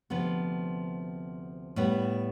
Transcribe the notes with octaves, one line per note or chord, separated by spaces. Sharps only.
D2 C3 F3 B3
A2 G3 B3